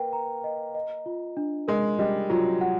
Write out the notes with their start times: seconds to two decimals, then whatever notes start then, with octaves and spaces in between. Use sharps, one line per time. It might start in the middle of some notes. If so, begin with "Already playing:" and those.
Already playing: A#3 B4 G5
0.13 A#5
0.44 D#5
0.75 D#5
1.06 F4
1.37 D4
1.68 G#3 A#4
1.99 G3 D#5
2.30 F#3 F4
2.61 F#5